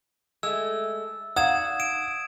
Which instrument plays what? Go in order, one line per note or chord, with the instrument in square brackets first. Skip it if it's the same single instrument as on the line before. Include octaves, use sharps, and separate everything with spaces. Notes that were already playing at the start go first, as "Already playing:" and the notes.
[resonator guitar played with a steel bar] G#3 A3 [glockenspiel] E6
[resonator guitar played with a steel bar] D#4 D5 F5 [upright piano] F#5 [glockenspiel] D#6 G#6 E7
[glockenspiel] D7 E7